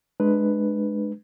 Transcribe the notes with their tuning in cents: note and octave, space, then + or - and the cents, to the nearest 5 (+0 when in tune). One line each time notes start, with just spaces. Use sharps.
G#3 +20 D4 +30 B4 +0